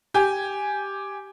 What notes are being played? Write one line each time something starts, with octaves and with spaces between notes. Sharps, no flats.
G4 G#5